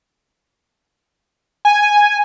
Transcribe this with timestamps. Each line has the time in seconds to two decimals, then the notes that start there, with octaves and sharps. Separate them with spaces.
1.65 G#5